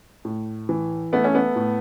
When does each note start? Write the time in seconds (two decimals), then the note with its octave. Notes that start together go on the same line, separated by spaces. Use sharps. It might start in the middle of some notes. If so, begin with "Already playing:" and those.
0.25 A2
0.69 E3
1.12 A3 B3
1.24 C#4
1.35 B3
1.56 A2